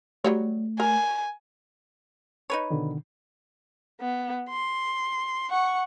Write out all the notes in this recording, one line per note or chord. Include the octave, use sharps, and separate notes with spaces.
F#3 G3 A3 C#5
A#4 G#5
D#4 B4 C#5
B2 D3 D#3
B3
C6
F#5 C#6